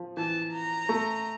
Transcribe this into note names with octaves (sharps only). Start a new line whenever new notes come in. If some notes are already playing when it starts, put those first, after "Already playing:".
Already playing: F3
E3 A5
A#5
A3